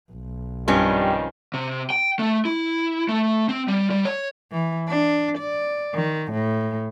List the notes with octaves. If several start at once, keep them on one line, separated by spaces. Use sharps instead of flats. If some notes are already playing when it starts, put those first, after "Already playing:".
B1
G2 D#3 F3 G3 C4 C#4
C3
G5
A3
E4
A3
C4
G3
G3
C#5
E3
D4
D5
D#3
A2